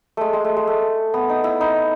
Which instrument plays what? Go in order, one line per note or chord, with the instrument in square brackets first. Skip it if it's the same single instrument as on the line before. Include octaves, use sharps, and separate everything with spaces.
[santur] G#3 A3
G#3
A3
G#3
A3
B3
D#4
E4
D#4